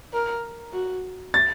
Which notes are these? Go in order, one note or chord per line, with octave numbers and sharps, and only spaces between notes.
A#4
F#4
A6